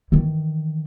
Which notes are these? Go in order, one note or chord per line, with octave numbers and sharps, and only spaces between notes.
D#3 E3